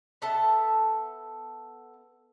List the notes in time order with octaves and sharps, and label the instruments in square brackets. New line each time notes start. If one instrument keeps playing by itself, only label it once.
[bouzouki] B3 A4 E5 A5